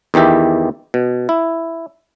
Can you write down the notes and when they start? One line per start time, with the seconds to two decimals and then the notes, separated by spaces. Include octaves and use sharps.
0.14 E2 D#3 E3 G4 E5
0.94 B2
1.29 E4